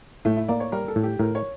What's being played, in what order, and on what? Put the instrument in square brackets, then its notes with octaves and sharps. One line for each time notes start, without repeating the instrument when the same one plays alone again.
[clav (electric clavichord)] A2 [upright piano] A3
[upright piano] E4
[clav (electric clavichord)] A#3 [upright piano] D5
[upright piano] C#5
[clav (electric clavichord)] G3 [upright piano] A#4
[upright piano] A4
[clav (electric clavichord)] A2
[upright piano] G4
[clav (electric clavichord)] A2 [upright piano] A#4
[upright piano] C#5